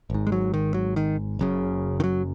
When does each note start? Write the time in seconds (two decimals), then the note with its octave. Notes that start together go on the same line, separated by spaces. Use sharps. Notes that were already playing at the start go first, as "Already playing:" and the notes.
0.10 G#1 G#2
0.27 G#3
0.32 F#3
0.54 D#3
0.74 F#3
0.96 D#3
1.39 F#1 F#2 C#3
2.00 D#3
2.04 F#3